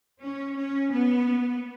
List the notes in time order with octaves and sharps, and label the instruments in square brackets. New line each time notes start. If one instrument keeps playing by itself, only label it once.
[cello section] C#4
C#4
B3